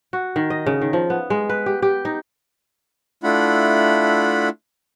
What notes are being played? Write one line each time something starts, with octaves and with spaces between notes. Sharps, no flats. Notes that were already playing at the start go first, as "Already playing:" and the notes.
F#4
D#3
D#5
C#3
D#3
F3
B3
G#3
B4
G4
G4
D#4
A3 D4 E4 F4 F#5 B5